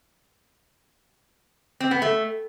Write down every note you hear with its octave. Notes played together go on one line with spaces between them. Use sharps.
C4
B3
A3